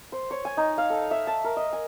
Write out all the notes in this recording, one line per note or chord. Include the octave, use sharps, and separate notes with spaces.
C5
C#5
G#5
D#4
F5
A4
E5
A5
A#4
D#5
G#5